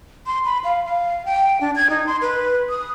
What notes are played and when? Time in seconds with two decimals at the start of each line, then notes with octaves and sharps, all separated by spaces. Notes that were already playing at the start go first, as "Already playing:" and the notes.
0.26 C6
0.45 B5
0.64 F5
0.85 F5
1.25 G5
1.61 D4
1.76 G#6
1.90 D#4
2.06 C6
2.21 B4
2.69 D#6